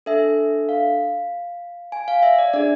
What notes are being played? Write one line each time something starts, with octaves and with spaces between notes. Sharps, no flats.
D4 A4 E5
F5
G#5
F5
E5
D5
D4 G#4 D5